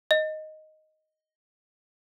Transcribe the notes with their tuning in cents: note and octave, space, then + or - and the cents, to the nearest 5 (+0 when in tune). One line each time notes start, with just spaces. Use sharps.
D#5 +0